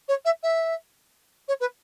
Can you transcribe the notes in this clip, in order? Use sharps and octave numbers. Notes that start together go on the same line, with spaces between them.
C#5
E5
E5
C#5
B4